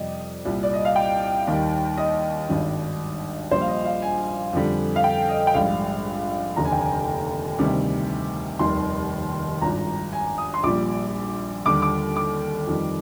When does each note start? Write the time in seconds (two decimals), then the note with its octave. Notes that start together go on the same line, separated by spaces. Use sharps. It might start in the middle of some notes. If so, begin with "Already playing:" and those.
Already playing: F2 C3 G3 D5 D#5
0.45 C2 A#2 G3
0.63 D5
0.74 D#5
0.85 F5
0.96 G5
1.47 D#2 D#3 G3
1.97 D#5
2.49 G#1 G2 D#3 G3
3.51 A#1 A#2 G3 C5
3.61 F5
3.68 D#5
3.85 F5
4.02 G#5
4.53 F2 D3 G3
4.96 F5
5.04 G5
5.29 D#5
5.47 G5
5.54 A#1 G#2 G3 F5
6.56 F1 D#2 D3 A#5
6.65 G#5
6.72 G5
6.81 G#5
7.59 D2 C3 D#3 G3
8.59 F1 D#2 D#3 G3 C6
9.61 G#1 G2 F3 A#5
10.13 G#5
10.38 D#6
10.54 C6
10.63 A#1 A#2 G3 D6
11.66 D#2 D3 G3 D6
11.82 D6
12.16 D6
12.67 F2 D#3 G3